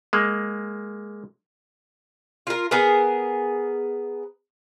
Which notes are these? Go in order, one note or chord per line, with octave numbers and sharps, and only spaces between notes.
G#3 A#3
F4 A#4
B3 G#4 A#4